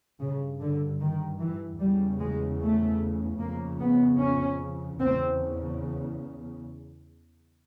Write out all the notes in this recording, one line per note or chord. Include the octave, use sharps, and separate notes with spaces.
G2 C#3
D3
D#3
E3
E2 C#3 G3
G#3
A3
F2 C#3 A#3
B3
C#4
E2 C#3 C4